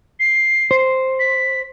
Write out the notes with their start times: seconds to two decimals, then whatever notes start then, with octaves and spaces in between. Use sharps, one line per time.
0.20 C7
0.71 C5
1.20 B6